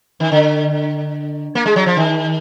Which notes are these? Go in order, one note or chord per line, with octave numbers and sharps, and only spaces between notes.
D#3
D3
A#3
G#3
F#3
F3
D#3